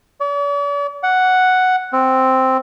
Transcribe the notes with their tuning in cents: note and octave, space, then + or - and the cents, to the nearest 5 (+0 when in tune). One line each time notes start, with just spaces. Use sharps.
D5 -45
F#5 +0
C4 +0